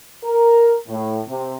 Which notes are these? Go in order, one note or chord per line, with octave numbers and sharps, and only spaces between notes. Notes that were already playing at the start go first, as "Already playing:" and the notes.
A#4
A2
C3